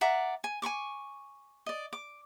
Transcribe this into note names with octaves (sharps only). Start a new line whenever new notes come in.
D5 E5 F#5 A#5
G#5
G#5 B5 C#6 D6
D5 D#5
D6